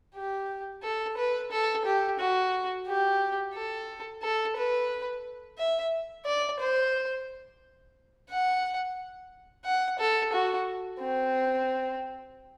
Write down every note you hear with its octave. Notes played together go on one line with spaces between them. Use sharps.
G4
A4
B4
A4
G4
F#4
G4
A4
A4
B4
E5
D5
C5
F#5
F#5
A4
F#4
C4